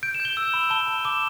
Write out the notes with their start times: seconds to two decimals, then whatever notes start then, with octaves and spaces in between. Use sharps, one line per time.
0.03 G6 D7
0.14 E7
0.20 G6
0.25 G7
0.37 E6 E7
0.54 B5
0.70 A5 G7
0.88 A5
1.05 D6 E7